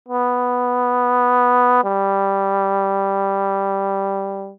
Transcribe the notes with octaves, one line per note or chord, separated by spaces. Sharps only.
B3
G3